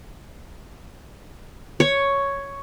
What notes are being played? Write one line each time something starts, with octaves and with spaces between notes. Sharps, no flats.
C#5